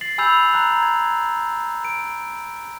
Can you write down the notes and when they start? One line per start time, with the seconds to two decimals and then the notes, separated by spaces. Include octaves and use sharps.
0.01 A6 C7 F#7
0.18 G#5 B5 E6 G6 F7
0.54 A#5 F#6
0.83 G#6
1.85 D7